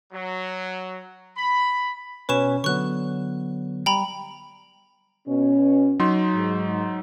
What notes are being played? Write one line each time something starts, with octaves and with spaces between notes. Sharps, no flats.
F#3
B5
B2 C#4 B4 C#5 C#6 E7
D3 F#3 B3 C#6 F#6
G3 G5 A#5 B5
B2 C#4
F#3 D#4 C6
G#2